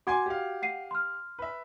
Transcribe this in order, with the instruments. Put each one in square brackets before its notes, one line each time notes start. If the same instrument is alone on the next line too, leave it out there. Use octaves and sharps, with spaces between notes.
[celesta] F#4 F#5 G#6 [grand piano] G#5 C6 D6
[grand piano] G4 F5
[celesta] F#5 C7 D#7
C6 F6
[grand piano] B4 E5